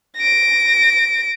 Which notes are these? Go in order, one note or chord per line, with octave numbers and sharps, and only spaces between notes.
A#6 D7